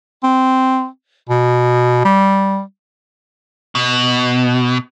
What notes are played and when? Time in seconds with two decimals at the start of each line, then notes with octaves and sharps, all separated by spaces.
0.23 C4
1.29 B2
2.05 G3
3.75 B2